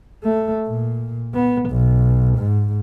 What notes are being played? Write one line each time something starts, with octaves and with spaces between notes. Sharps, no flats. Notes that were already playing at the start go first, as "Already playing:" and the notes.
A3
A#2
B3
B1
G#2